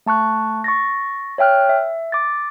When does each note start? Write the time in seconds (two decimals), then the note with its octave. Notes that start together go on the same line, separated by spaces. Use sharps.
0.06 A3 A5 C#6 F#6
0.64 C#6 A6 A#6
1.38 C#5 E5 G5 F6 F#6
1.69 E5
2.12 D6 A6